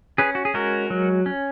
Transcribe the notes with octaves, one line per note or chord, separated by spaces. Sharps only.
C#4 G#4 B4
F#4
G#4
G#3 F#4 A#4
F#3
C#4